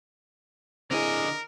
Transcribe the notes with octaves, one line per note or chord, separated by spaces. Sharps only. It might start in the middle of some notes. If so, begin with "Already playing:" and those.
D3 C4 E4 G#4 A#4 D#5